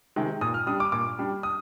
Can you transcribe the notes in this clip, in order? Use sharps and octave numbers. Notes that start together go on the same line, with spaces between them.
C3 D#3 G#3
A#2 D#6
F6
G3 D4 D#6
D6
A#2 D6
G3 D4
D#6